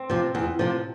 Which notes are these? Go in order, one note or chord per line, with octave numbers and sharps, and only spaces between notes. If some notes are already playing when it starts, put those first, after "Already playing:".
Already playing: C4
C3 F3
E2
C3 F3